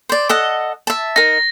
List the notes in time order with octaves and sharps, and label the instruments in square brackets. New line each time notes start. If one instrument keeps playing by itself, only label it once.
[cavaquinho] C5 D5
A4 D#5 F#5
E5 A5
[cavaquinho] D#4 A#4 [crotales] A#6